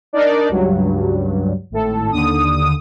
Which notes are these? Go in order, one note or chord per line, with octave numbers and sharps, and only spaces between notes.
D4 D#4 A#4 D5
C#2 G2 F#3
G#1 A2 A4
D#2 D3 D#6